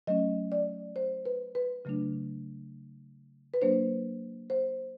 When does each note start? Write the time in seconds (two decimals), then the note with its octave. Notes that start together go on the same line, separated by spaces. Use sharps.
0.07 F#3 A3 C#4 D#5
0.52 D5
0.96 C5
1.26 B4
1.55 B4
1.85 C#3 F#3 A3 D4
3.54 B4
3.61 F#3 A#3 D4 C5
4.50 C5